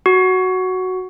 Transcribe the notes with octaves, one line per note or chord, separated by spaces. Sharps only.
F#4